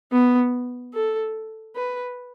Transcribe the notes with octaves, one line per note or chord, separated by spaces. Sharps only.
B3
A4
B4